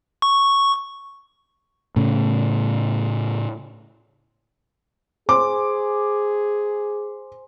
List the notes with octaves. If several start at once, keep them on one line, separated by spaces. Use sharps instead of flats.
C#6
A2 C#3
G#4 C5 G#5 C6 D6